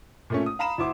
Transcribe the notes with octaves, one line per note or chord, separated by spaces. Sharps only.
A#2 A3 C#4
D#6
F5 A#5 B5 E7
D2 E4 C6 D6